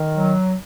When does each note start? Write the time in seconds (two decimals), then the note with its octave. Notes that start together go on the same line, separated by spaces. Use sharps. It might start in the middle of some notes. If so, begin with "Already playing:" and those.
Already playing: D#3
0.14 F#3